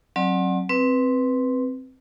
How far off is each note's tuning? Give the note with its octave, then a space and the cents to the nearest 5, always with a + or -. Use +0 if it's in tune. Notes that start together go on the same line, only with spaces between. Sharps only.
F#3 +0 C4 +35 D5 +25
C4 +0 B4 +0